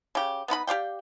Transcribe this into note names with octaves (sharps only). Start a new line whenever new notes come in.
C#3 G4
B3 D#4 B4 B5
G4 D5 F5 G5